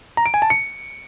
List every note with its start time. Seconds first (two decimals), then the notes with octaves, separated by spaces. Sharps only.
0.17 A#5
0.26 D7
0.34 G#5
0.42 A5
0.50 C#7